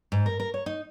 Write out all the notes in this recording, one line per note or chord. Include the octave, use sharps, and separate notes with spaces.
G#2
A#4
A#4
C#5
D#4